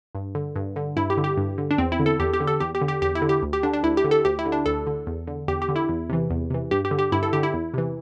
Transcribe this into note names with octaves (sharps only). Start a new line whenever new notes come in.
G2
D3
G2
D3
G2 E4
G4
D3
G4
G2
D3
D4
E2 C4
E4
D3
A4
E2 G4
G4
D3
A4
E2 G4
G4
D3
G4
E2 G4
E4
D3
G4
D2
G4
D3 D4
D4
D2 E4
G4
D3
A4
D2 G4
E4
D3
D4
D2 A4
D3
E2
D3
E2 G4
G4
D3
E4
E2
C3 E3
E2
C3 E3
G2 G4
G4
D3
G4
G2 E4
A4
D3 G4
E4
E2
C3 E3